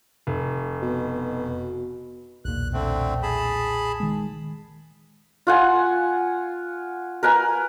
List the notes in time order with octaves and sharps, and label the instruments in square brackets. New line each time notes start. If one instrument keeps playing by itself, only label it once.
[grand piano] F1
[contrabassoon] B2
[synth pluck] B1 E2 A#2 [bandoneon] F#6
[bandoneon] D3 A3 C4
G#4 A5 B5
[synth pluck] D#3 G#3
[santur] F4 F#5 G#5
A#4 B4 G#5